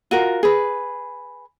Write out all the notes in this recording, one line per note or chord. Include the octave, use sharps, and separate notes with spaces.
F4 F#4 A#4
G#4 B4